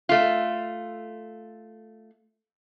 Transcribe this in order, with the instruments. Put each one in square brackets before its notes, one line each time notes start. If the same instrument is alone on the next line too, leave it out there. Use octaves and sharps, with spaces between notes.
[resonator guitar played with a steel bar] A3 F4